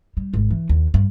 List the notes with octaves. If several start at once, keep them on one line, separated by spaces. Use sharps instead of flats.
G3
G#1
E3
D#2
G2